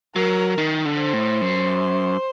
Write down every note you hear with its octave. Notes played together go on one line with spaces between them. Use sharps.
F#3 A#4
D#3
D3
C5
A2
F#2